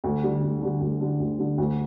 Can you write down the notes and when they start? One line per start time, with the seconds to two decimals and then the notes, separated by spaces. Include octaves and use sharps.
0.04 D2
0.23 D3 G3
0.43 D2
0.62 D3 G3
0.81 D2
1.00 D3 G3
1.19 D2
1.39 D3 G3
1.58 D2